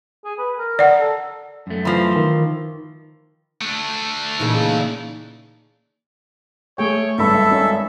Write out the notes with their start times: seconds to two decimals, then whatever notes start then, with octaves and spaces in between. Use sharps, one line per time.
0.25 G#4
0.38 B4
0.58 A#4
0.79 D5 F#5
1.00 A4
1.67 F#2 A3
1.85 E3 F3 C6
2.15 D#3
3.61 A3 D4
4.40 A#2 C#3 E3 A#3 D#4
6.78 A3 G#4 C#5 G5
7.19 G#1 G2 A4 E5 B5
7.51 C#4 D#4